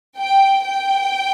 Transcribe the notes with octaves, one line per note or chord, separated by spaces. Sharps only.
G5
G5